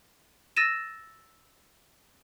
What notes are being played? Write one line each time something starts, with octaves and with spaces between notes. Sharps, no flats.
E6 A6 A#6 D#7 E7